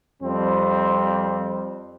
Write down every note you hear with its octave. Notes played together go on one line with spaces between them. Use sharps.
F2 G3 C4